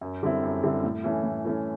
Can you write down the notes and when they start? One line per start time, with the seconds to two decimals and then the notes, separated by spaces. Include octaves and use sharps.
0.01 F#2
0.23 D3 G3 C4 E4
0.43 F#2
0.63 D3 G3 C4 E4
0.84 A2
1.04 E3 A3 C#4
1.24 A2
1.45 E3 A3 C#4